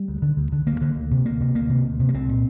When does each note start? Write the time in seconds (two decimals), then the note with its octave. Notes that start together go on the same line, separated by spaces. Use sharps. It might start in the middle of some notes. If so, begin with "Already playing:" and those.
Already playing: G3
0.08 D2
0.22 D3
0.37 D2
0.52 D3
0.67 D2 A#3
0.82 D3
0.96 D2
1.11 C3
1.26 D2 A#3
1.41 C3
1.55 D2 A#3
1.70 C3
1.85 D2
2.00 C3
2.09 A#3
2.14 C2 C4
2.29 A#2